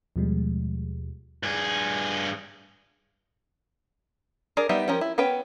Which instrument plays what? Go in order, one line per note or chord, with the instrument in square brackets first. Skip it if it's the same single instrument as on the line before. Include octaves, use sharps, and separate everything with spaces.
[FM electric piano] D#2 B2 F3 G3 G#3
[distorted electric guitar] G2 G#4
[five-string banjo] D4 G#4 A#4 D5
G3 B3 D#4 E5
F3 C#4 G4 A#4
E4
B3 C#4 B4 G5